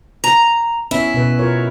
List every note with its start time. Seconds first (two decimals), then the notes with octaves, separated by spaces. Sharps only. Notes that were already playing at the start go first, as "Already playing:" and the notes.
0.24 A#5
0.91 B3 C#4 E4 E5
1.14 B2 B3 B4
1.39 F4 A#4 C#5